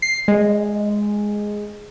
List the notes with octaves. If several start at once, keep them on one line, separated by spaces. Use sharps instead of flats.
C7
G#3